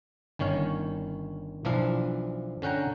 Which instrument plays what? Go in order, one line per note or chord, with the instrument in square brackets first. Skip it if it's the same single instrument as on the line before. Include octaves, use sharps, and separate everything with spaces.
[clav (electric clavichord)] G1 D#3 C#4 C#5 F5
B1 E3 F3 D4 F5
D3 C#4 F#5 G5 A#5